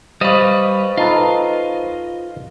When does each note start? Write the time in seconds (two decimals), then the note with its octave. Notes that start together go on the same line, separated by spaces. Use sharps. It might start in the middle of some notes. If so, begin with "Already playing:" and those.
0.21 G3 B4 C5 D#5 F5 C#6
0.98 D#4 F4 A4 B4